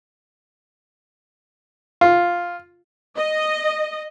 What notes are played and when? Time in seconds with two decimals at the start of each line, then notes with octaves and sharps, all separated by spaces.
2.01 F4
3.18 D#5